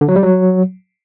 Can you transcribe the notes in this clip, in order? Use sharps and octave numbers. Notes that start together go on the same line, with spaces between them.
D3
F#3
G3
F#3